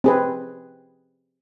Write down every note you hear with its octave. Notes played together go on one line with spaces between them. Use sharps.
C4 G#4 B4